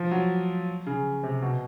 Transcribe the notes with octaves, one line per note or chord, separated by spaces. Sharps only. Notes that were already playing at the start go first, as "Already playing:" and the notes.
Already playing: F3
F#3
C#3
C3
B2